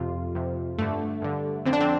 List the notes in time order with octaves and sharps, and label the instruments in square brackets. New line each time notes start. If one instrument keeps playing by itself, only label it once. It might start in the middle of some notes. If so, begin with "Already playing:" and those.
Already playing: [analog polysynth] F2 C3 F4
F2 C3
G2 D3 A3
G2 D3
F2 D3 C4
D4
C4